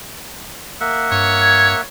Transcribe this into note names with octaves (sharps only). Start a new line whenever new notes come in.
A#3 E5 F#5
G2 C#5
G#6